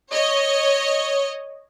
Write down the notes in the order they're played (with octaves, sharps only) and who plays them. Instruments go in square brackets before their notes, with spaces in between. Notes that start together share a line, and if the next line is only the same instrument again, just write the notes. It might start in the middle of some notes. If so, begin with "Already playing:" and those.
[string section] C#5 D#5